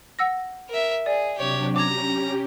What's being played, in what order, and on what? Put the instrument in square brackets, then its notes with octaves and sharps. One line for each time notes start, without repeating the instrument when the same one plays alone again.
[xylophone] F#5 E6 A#6
[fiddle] A#4 E5
[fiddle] G#4 [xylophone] D5
[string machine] C3 F#3 D4 [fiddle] G4 C#5
[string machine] C#4 G4 [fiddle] A#5 [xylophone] D6 G#6